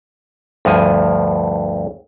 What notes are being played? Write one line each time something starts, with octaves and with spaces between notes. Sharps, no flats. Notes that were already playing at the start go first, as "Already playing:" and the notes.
D2 G2 F3 G#5